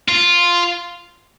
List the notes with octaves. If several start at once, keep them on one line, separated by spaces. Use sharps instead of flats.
F4